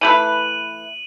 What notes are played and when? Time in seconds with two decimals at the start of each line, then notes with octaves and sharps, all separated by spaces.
0.01 E3 A3 B4 D#7 F#7